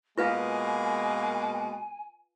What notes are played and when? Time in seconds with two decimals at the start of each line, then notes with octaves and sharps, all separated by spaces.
0.18 B2 G#3 A#3 F4 B4 F5 G#5